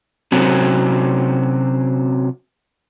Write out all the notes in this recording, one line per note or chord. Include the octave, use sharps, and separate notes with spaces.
C3 F#3 C4 C#4